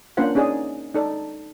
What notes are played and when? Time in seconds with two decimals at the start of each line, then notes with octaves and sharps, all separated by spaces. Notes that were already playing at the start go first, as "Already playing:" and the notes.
0.17 A#3 C#4 D4 F4 C5 F#5
0.35 C#4 D#4 G#4 D5 D#5
0.94 D#4 A4 D5